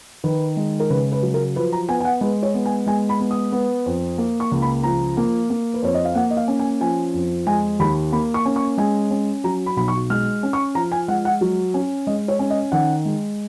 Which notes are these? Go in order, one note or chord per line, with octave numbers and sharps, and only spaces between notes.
D#3 B4
G#3
A#4
C#3 B4
B4
F#3
A#4
F3 B4
A#5
B3 G#5
G#5
F#5
G#3 B4
C#5
B3
G#5
G#3 G#5
B5
B3
D#6
B3
F2
A#3
C#6
C#2
B5
F3 A#5
A#3
A#3
B4
F2 C#5
D#5
F5
A#3 F#5
D#5
F5
C#4
G#5
F3 G#5
F2
G#3 G#5
D#2 B5
A#3 B5
C#6
C#4
C#6
G#3 G#5
C#4
F#3 A#5
B5
B1 B5
C#6
G#3 F6
C#4
C#6
F3 A#5
G#5
G#3 F#5
F#5
F#3
C#4
G#3 D#5
C#5
C#4
D#5
D#3 F#5
G#3